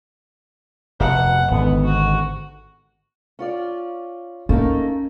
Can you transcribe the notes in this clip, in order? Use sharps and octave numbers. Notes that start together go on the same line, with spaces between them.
F1 B2 F#5
G#1 G#2 D3 B3
F#4
C#4 F4 D5
A3 A#3 C#4 D#4